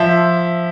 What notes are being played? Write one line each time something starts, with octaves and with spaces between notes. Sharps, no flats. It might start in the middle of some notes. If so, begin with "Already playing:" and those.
Already playing: F3 E5